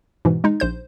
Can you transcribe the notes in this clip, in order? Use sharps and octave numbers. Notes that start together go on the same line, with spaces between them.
G#2 B2 E3
G#3 D#4
A#1 C5 G6